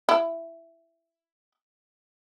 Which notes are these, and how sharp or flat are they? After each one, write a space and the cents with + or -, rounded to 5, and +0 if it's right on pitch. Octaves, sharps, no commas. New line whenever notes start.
E4 +10